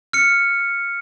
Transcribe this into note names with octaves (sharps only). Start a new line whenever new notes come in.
F6 C#7